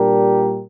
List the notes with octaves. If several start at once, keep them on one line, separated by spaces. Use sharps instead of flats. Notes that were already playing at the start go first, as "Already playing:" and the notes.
Already playing: A#2 G3 D4 G4 A#4